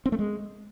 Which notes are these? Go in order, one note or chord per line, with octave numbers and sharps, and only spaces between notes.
C4
A3
G#3